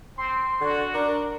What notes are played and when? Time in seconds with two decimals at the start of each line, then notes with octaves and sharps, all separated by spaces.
0.18 C4 C6
0.61 D3 F#4
0.94 D4 A#4